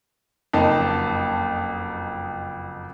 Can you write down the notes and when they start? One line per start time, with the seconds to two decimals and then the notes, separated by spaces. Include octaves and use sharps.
0.53 F#1 F2 D#4 A5